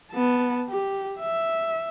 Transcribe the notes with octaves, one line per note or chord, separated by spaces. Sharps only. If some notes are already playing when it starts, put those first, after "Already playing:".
B3 A5
G4
E5